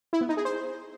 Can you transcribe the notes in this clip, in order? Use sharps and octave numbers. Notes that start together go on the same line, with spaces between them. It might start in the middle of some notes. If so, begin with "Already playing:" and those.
E4
B3
D#4
G#4
C5